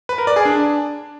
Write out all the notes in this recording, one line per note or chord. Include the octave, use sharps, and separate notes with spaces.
B4
A#4
D5
G#4
D4